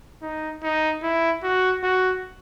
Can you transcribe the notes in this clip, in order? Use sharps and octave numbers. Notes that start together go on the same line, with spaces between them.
D#4
D#4
E4
F#4
F#4